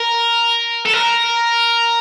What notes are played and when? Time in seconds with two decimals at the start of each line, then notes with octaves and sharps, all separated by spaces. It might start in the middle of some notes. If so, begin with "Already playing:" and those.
Already playing: A#4
0.85 A4
0.93 A#4